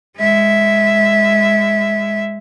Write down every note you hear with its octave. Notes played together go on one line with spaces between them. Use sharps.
G#3 E5